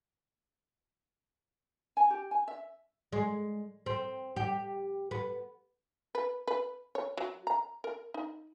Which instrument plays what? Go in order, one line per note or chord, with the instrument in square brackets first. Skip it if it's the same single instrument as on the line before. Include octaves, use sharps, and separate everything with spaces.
[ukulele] G#5
G4
G#5
E5
[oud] G#3
C4
G4
B3
[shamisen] B4
B4
C#5
F#3
A#5
A#4
D#4